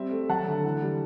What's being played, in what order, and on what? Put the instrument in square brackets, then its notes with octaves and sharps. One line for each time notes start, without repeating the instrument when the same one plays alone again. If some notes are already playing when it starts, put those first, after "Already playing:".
Already playing: [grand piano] G3 C4 E5
A3
F#3 F#5 A5
D3
E3
G3